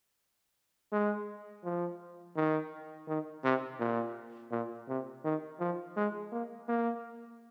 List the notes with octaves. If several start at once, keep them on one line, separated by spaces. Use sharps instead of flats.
G#3
F3
D#3
D#3
C3
A#2
A#2
C3
D#3
F3
G#3
A#3
A#3